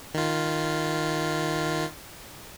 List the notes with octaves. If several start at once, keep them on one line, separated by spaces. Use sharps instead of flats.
D#3 F4